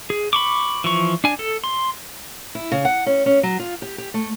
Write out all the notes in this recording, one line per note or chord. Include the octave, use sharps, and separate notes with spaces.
G#4
B5 C#6 D6
E3 F3 C#6
D4 G#5
A4
C6
E4
C#3
F#5
C#4
C#4
F#3
F4
G4
G4
A3